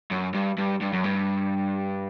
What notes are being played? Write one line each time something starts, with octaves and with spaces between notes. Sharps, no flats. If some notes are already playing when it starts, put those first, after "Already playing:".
F#2
G2
G2
G2
F#2
G2